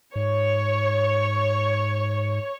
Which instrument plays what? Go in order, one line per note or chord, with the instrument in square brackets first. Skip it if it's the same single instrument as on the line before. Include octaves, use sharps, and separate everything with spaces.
[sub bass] G#2 [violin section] C#5